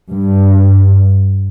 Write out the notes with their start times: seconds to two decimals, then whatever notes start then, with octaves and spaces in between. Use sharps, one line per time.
0.13 G2